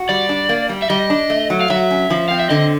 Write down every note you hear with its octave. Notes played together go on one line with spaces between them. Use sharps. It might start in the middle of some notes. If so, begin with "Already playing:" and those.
Already playing: F#4
G3 D5
D4
A#3
G3
E5
G3 D#5
D4
A3
F#3
F5
F#3 E5
C#4
F3
C4 F5
E5
D3 D#5